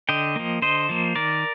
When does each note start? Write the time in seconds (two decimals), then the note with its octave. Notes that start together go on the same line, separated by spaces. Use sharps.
0.09 D3 D#5 G5
0.36 F3 A#3
0.62 D3 C5 D#5
0.89 F3 A#3
1.16 D#3 A#4 D5